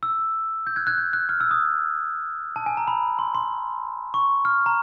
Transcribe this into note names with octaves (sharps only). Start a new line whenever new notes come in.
E6
G6
F#6 G#6
F#6 G#6
G6
F#6
F6
E6
D#6
A5
G#5
A#5
B5
C6
C6
C#6
F6
A#5